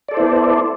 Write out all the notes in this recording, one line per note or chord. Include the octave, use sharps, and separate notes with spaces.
B3 E4 A4 C5 D5